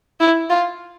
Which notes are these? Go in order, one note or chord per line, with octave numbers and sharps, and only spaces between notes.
E4
F4